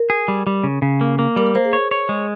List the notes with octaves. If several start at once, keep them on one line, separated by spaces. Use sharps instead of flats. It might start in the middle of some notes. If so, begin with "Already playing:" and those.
Already playing: A#4
G#4
G3
G3
C#3
C#3
A#3
A#3
G3 A#4
A#4
A#3 C5
G#4
C#5
C#5
G#3